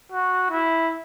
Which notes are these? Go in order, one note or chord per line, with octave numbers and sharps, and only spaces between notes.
F#4
E4